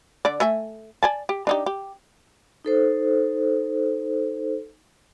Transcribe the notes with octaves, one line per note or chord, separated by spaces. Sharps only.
D3 D5
A3 E5 G#5
D5 G#5 A5
G4
D4 D#4 G4
G4
D#4 A4 C5